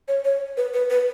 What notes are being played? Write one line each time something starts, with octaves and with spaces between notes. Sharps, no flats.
C#5
C#5
B4
B4
B4